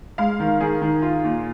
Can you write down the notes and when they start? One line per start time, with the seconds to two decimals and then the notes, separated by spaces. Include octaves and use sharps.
0.18 G#3 F5
0.40 D#3
0.60 D#3 G#4
0.81 D#3
1.02 F4
1.24 A#2